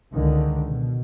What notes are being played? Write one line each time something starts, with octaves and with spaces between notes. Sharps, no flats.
C#2 D3 D#3
B2